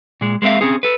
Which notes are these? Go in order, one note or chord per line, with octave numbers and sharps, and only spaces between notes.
A#2 G#3
G#3 A#3 C4 E5 F5
C4 C#4 G#4
A4 B4